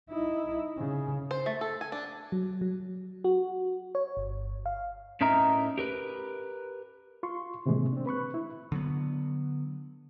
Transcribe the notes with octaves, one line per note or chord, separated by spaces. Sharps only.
D#4 E4
C#3
C5
A3
A4
G#5
D4
F#3
F#3
F#4
C#5
G1
F5
A2 C#4 D#4 A#4 E5 A#5
G4 A#4 B4
F4 C6 C#6
A2 C3 D#3 E3 G#3 A#3
C4 D4
B4 B5 C#6 F#6
E4
D3 F#3 B3